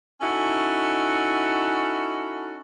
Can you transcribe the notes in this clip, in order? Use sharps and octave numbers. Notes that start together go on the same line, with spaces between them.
C#4 D#4 E4 F#4 A4